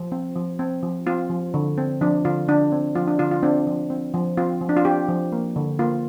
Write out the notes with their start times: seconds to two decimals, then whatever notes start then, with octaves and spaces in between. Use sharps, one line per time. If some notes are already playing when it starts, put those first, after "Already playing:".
Already playing: F3
0.12 C4
0.36 F3
0.59 C4
0.83 F3
1.07 C4 F4
1.30 F3
1.54 D3
1.78 C4
2.01 F3 D4
2.25 D3 F4
2.48 D3 D4
2.72 C4
2.95 F3 F4
3.07 D4
3.19 D3 F4
3.31 F4
3.43 C4 D4
3.67 F3
3.90 C4
4.14 F3
4.37 C4 F4
4.61 F3
4.69 D4
4.77 F4
4.85 C4 G4
5.09 F3
5.32 A#3
5.56 D3
5.79 A#3 F4